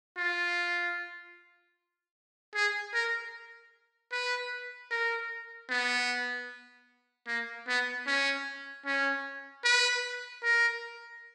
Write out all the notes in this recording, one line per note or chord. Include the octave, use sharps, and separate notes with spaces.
F4
G#4
A#4
B4
A#4
B3
A#3
B3
C#4
C#4
B4
A#4